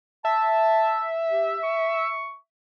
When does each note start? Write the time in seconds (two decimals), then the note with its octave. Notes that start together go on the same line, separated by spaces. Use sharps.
0.25 E5 A5
1.30 G4
1.63 C#6